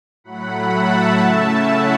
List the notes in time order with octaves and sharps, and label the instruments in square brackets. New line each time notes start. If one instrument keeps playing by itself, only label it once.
[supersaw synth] A2 F#3 A3 F#5 B5
E5 A5
C#3 A3 C#4 E4
F#5 B5